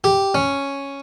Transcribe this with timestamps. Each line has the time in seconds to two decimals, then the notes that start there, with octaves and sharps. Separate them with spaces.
0.04 G4
0.35 C#4